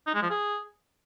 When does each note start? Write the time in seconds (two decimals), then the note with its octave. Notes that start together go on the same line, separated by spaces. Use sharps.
0.07 D#4
0.15 G#3
0.22 F3
0.30 G#4